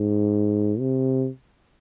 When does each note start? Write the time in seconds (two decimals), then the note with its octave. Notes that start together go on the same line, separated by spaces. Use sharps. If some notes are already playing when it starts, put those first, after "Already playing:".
Already playing: G#2
0.80 C3